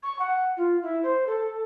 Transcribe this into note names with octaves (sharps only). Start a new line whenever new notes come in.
C#6
F#5
F4
E4
C5
A4